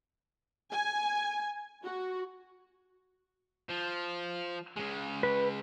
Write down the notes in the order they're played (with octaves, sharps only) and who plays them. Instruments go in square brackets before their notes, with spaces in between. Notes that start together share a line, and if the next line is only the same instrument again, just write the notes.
[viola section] G#5
F#4
[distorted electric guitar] F3
C#3 G#3
[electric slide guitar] B4